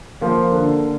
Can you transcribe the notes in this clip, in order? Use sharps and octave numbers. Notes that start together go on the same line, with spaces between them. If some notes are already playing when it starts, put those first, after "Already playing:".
F3 A#3
D3